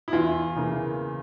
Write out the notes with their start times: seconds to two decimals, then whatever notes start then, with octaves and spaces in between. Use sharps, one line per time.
0.08 E4
0.12 E2 F4
0.56 C#3 E3 A#3